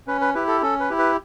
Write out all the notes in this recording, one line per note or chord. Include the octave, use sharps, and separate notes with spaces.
C#4 B4
B4
E4 G4 B4
A4
C#4 A4
B4
E4 G4
B4